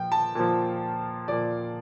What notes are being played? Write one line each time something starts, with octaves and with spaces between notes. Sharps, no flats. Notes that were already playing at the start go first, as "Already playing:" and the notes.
Already playing: A#2 F3 G5
A5
A#2 F3
A#2 F3 D5